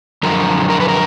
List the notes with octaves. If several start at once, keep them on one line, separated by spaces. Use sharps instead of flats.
F#2 D3 F3 A#4
A#4
B4
A#4